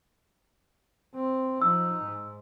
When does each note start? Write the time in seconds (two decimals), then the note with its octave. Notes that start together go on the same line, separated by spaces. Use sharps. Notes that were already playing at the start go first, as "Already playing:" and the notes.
1.15 C4
1.62 F3 D#4 E6
2.03 G#2